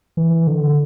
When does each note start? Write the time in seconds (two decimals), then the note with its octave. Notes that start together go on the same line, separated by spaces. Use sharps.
0.17 E3
0.47 D3